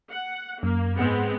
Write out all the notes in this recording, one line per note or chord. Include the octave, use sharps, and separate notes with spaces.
F#5
F#2 A#3
G#2 G#3 B3 C4 F#5 C#7